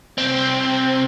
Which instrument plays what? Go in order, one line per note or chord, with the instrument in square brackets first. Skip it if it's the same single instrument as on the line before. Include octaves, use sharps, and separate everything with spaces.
[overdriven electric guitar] C2 C4